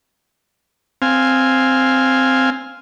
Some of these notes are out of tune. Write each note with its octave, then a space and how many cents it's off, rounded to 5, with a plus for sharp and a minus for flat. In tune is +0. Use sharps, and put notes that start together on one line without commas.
C4 +0 F5 +0 G#5 +0